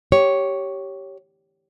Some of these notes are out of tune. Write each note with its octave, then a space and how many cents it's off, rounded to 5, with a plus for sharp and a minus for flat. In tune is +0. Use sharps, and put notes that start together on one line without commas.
G4 -10 C#5 +0